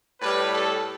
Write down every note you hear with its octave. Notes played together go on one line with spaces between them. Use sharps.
A2 G3 B4
A4